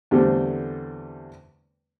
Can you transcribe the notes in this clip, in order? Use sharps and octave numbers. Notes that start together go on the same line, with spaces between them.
E2 D3 G3 A3 C4